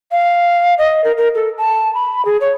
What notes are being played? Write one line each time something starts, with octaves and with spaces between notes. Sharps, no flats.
F5
D#5
A#4
A#4
A4
A5
B5
G#4
C#5